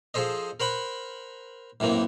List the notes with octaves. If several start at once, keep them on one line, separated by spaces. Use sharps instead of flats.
F3 G#4 A4 C5 D#5
A#4 C5 F#5 B5
F#2 A2 E3 A#3 C4